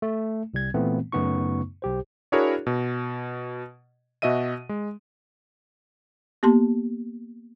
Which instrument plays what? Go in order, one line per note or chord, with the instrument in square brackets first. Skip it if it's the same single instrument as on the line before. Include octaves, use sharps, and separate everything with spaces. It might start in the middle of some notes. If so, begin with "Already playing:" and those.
[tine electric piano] A3
C2 G3 G#6
A#2 E3 A3 B3 C4
F#2 C#3 A3 B3 D#4 C#6
B1 G4 C5
[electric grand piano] D4 E4 F#4 G#4 A#4 C#5
B2
B2 F#4 D#5 E5 D#7
G#3
[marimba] A#3 B3 G4 A5 C6